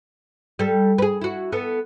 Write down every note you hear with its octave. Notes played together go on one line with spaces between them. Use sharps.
G3 A4
G#4 B4
E4 F#4
B3 A4